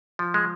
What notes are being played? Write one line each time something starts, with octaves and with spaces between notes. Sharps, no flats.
F3
G#3